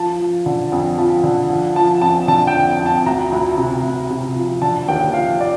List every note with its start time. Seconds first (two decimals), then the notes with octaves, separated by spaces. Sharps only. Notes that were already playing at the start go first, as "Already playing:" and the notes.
Already playing: F3 A5
0.19 F3
0.46 D3
0.72 F2
0.98 F3
1.24 D3
1.49 F3
1.76 F3 A5
2.02 F2 A5
2.28 D3 A5
2.47 G5
2.54 F2
2.79 F2
2.86 A5
3.06 D2 A#5
3.32 D2
3.58 C3
3.83 D2
4.10 C3
4.36 F3
4.62 D3 A5
4.88 D#2 G5
5.14 F3 F5
5.41 D5